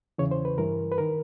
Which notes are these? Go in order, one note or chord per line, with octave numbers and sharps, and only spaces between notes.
E2 C#3 E3 C#5
C5
B4
G2 E3 A#4
B4
D#3 A#4